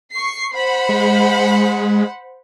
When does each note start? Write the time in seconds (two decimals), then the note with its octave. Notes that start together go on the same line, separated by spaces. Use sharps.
0.13 C#6 C7
0.54 C5 F#5 B5
0.89 G#3